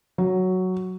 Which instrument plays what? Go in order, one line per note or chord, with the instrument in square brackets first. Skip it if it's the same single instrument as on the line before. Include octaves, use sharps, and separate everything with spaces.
[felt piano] F#3